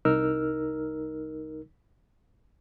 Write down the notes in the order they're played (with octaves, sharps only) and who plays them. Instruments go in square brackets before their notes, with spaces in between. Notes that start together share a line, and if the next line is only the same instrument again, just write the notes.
[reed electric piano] C2 D#4 A#4 E6 F6